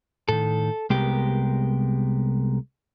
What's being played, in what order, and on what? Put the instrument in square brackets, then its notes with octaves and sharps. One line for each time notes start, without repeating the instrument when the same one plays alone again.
[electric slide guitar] A2 D#3 [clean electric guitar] A4
[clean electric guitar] C2 G4 [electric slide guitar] G#3 B3 A#4